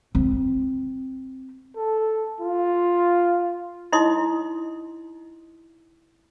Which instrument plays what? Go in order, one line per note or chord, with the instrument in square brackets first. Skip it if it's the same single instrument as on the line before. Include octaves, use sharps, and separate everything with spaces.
[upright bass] C4
[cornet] A4
F4
[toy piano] D#4 E4 D#5 C6 D#6